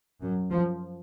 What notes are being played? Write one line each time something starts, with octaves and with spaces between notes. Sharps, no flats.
F#2
F3